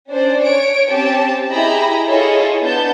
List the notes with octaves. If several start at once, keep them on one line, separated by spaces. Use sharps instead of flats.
C#4 D4 C5 D5
C#5 D7
C4 C#4 G4 A5
E4 G4 G#4 D#5 A#5 B5
E4 F4 G#4 A4 C#5 D#5
B3 D4 A5 G6